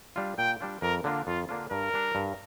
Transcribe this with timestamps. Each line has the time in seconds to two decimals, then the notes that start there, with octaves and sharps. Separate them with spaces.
0.16 G3 D4 F4
0.38 A#2 G5
0.60 G3 D4 F4
0.82 F2 A#4
1.04 D3 A#3 D4 F4
1.27 F2 F4
1.49 D3 A#3 D4 F4
1.71 G2 A#4
1.93 G3 D4
2.15 G2